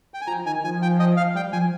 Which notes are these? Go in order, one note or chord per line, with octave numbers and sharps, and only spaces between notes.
G5
G#5
F3 A#5
D#3 G#5
F3 G#5
G5
D#5
F5
G3 G5
F3 G#5